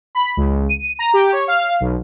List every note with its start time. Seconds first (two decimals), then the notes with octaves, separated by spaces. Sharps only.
0.15 B5
0.37 C#2
0.69 D#7
0.99 A#5
1.13 G4
1.32 C#5
1.48 F5
1.80 B1